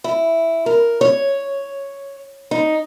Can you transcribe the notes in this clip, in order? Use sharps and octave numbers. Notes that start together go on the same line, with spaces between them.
E4
A#4
C#5
D#4